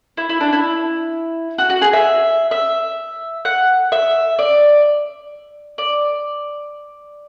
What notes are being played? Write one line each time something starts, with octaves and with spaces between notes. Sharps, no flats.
E4
E4
D4
E4
F#4
F#4
G#4
E5
E5
F#5
E5
D5
D5